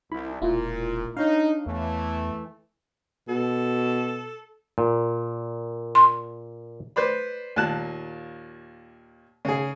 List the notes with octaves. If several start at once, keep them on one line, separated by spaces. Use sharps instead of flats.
C2 E4 B5
E1 A#2 E4 F4
D4 D#4 C#5 F5
E2 E3 A3
B2 A4
A#2
C6
B4 C5 D5 B5
D#2 A#2 A5 F#6
C#3 G#4